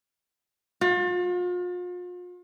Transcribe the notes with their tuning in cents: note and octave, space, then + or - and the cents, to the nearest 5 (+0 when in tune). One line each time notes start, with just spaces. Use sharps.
F4 +40